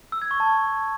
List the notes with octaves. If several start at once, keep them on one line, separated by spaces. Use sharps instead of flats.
E6
G#6
C#6
A5